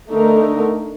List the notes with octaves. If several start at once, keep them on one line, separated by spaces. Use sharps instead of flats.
D3 A3 D#4 A#4